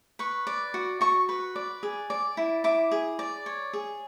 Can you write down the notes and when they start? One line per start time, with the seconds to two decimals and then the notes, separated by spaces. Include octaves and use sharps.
0.19 B4 C#6
0.47 D5
0.74 F#4
1.01 F#4 C#6
1.29 B4
1.56 D5
1.83 G#4
2.10 D5
2.37 E4
2.64 E4 D6
2.91 G#4
3.19 D5
3.46 C#5
3.73 G#4